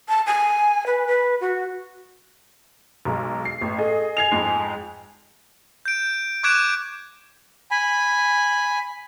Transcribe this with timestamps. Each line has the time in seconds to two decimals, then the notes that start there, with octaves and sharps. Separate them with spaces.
0.09 A5
0.27 G#5
0.86 B4
1.07 B4
1.41 F#4
3.05 B1 G#3 A#5
3.45 C7
3.61 A1
3.78 G#4 A4 D#5
4.17 G#5 G#6 C7 F7
4.32 F2 G#2 G#3
5.85 G6 D7
6.43 C#6 D6 F#6 G#6 D7 E7
7.71 G#5 B5